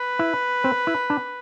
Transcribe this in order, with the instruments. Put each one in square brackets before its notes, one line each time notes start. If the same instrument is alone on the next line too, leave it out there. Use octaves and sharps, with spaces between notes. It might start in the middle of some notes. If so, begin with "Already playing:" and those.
Already playing: [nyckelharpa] B4
[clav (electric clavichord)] E4
C4
E4
D4